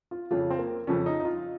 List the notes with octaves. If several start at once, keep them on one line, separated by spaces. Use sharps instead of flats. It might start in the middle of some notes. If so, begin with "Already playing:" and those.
F4
F2 C#3 F3 F4
C4
A#3
F2 C#3 F3 C#4
D#4
D#4
F4